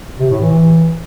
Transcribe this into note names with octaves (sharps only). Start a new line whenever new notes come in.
C3
A2
E3